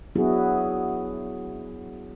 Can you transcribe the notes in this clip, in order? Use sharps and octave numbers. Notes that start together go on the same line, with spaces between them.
F#3 B3 D4 E4 F#4 G#4